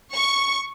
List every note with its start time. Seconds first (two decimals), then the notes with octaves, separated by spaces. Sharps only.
0.12 C#6